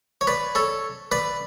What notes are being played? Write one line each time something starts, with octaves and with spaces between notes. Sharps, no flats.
C#5
B4 D5
A4 C#5
B4 D5